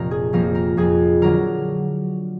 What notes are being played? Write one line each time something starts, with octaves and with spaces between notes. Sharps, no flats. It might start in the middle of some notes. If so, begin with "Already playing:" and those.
Already playing: F1 A#2 A#4
G#4
F2 F3 A#3 A#4
A#4
F2 G#4
D3 F#3 D4 A#4